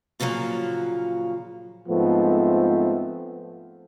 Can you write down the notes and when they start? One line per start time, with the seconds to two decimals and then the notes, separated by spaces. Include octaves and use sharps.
0.20 A#2 C#3 F3 F#3 A#3
1.89 G#2 F3 A3 B3 C4